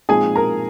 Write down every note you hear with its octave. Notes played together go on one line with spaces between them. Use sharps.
A#2 F3 G#3 C4 D#4 G#4 G#5
A#4 A#5